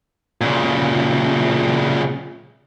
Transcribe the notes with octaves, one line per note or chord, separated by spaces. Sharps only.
A#2 C#3